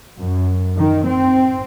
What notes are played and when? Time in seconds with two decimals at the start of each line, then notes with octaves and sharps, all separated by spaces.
0.18 F#2
0.76 D#3
1.07 C4